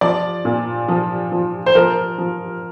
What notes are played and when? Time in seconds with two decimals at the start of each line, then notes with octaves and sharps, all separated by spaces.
0.01 F3 D5
0.45 A#2
0.88 F3
1.32 F3
1.66 C5
1.75 F3 A#4
2.18 F3